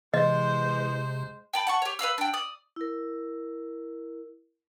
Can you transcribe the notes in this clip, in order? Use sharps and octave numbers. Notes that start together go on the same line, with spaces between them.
C3 E3 G#3 C5 D#5
G5 A5 B5
F#5 A5 C#6
G4 C#5
B4 D5 F5 E6
D4 G5
D5 D#6
E4 A#4